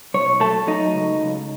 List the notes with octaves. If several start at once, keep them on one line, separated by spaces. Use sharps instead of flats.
B1 C#5
A3 A4
F#3 D#4
C#2
C#2